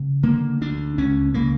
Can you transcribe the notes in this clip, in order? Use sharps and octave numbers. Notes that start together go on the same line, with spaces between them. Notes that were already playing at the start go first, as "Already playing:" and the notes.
Already playing: C#3
D3 A#3
D2 D4
C#2 C#4
C#3 A#3